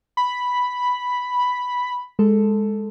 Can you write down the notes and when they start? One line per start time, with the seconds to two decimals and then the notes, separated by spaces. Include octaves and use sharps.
0.17 B5
2.19 G#3 A4